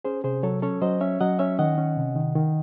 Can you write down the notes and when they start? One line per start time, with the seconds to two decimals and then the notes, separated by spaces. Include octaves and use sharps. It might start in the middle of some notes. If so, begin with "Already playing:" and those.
0.05 C#4 G#4 C5
0.24 C3 G#4 C5
0.43 F#3 A4 C#5
0.62 C#4 A4 C#5
0.82 F#3 C5 D#5
1.01 C#4 C#5 E5
1.21 F#3 D#5 F#5
1.39 C#4 C#5 E5
1.59 D#3 D#5 F#5
1.78 C#4
1.97 C3
2.16 D#3
2.35 D#3